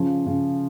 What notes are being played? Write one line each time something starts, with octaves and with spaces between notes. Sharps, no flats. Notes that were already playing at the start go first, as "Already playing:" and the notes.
Already playing: C#3 F3
C#3